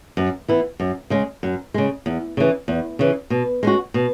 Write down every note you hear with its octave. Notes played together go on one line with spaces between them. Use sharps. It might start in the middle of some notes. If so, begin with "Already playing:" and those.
F#2
E3 B3 E4
F#2
C#3 G#3
F#2
C#3 G#3
E2
C#3 E3
E2
C#3 E3
B2
G#3 C#4 F#4
B2